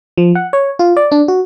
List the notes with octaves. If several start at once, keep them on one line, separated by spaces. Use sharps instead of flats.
F3
F#5
C#5
F4
D5
D4
F#4